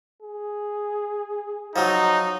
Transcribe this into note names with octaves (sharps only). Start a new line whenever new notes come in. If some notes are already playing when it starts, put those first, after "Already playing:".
G#4
F3 F#3 D#4